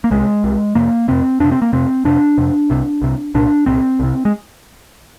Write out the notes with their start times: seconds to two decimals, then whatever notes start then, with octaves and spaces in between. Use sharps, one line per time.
0.04 A#3
0.11 C2 C3 G#3
0.44 C2 C3
0.75 F2 C3 A#3
1.08 F2 C3 C4
1.40 F2 C3 D4
1.51 C4
1.62 A#3
1.73 F2 C3 C4
2.04 F2 C3 D4
2.38 F2 C3
2.70 C2 C3
3.02 C2 C3
3.35 C2 A#2 D4
3.66 C2 A#2 C4
4.00 C2 C3
4.25 G#3